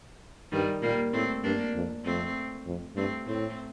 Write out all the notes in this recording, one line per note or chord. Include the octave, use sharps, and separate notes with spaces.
G2 D#3 G3
A#2 G3 A#3
A2 A3 C4
G2 A#3 D4
F2
F2 A3 C4
F2
G2 A3 C4
A2 A3 C4